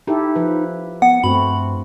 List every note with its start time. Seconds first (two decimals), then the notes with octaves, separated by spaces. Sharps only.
0.07 D#4 E4 G4 A4
0.36 F3 B4
1.02 B3 F#5
1.24 G2 A3 C4 F#4 B5